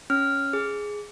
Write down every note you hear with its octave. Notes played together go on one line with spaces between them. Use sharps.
C#4 F6
G#4